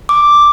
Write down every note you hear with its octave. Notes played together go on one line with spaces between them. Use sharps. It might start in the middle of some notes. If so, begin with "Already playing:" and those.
D6